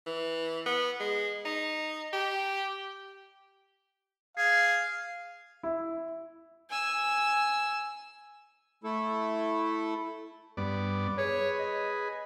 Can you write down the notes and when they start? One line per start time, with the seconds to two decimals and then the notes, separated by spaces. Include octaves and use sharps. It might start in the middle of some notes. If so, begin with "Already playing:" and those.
0.07 E3
0.66 B3
1.00 G#3
1.46 D#4
2.13 G4
4.37 G#4 F5
5.63 E4
6.70 G#5 E6
8.84 A3 E4 A4
10.57 G2 B3 D5
11.18 G#4 B4 C#5
11.59 D#5